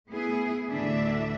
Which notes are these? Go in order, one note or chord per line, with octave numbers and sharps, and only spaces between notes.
A3 B3 E4 G#4
D2 A2 D3 E3 D4 E5